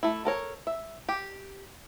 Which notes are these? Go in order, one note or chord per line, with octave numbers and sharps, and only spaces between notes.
A3 E4
A4 A#4 C#5
E5
G4